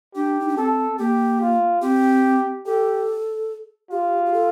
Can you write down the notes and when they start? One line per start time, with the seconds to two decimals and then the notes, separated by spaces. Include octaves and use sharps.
0.15 D4 G4
0.40 D#4
0.49 D4
0.57 C4 A4
0.99 A#3 G4
1.41 F4
1.82 C4 G4
2.66 G4 A4
3.90 F4 G4
4.26 G4
4.33 A4